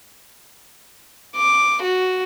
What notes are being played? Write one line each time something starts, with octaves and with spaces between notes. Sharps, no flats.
D6
F#4